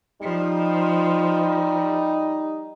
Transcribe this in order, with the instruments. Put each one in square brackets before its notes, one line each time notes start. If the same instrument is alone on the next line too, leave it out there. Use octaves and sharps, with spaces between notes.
[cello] F3 [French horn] G3 [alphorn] D#4